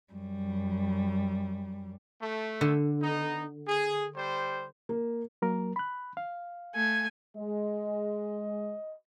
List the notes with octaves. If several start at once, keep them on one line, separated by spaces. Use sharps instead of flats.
F#2 G3
A3
D3
B3 D#4
G#4
G3 C5
A#3
F#3 A#3 A#4
B5 F#6
F5
A3 G#5
G#3 D#5